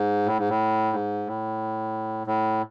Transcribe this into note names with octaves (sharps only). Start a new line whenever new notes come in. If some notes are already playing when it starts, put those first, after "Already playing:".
Already playing: G#2
A2
G#2
A2
G#2
A2
A2